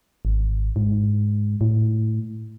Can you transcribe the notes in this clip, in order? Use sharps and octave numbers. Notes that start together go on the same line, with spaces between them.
G#1
G#2
A2